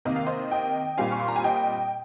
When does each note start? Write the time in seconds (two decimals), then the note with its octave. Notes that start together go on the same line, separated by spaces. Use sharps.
0.05 C3 D#3 A#3 D#5
0.16 F5
0.26 C5 D#5
0.51 D#5 G5
0.98 A#2 G3 C4 F5 G#5
1.12 C#6
1.20 C6
1.28 A#5
1.36 G#5
1.44 D#5 G5